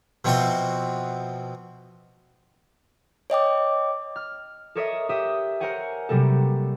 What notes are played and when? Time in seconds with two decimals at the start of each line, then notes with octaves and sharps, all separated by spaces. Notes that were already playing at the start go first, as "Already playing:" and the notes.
0.25 B2 F3 C4 F#4 E5 C6
3.30 C#5 D#5 G5 D6
4.16 F6
4.75 A4 A#4 C#5 D#5 E5 D#6
5.09 G4 E5 D#6
5.60 A#4 C5 C#5 F#5 G#5
6.09 C3 F#3 G3 A#3 A4